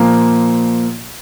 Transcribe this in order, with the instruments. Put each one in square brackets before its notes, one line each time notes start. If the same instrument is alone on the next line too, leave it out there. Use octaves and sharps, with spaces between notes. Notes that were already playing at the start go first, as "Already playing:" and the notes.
Already playing: [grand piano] A#2 F3 A#3